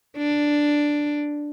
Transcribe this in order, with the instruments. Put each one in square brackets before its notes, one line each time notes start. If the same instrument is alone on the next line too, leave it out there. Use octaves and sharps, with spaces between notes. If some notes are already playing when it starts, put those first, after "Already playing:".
[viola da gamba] D4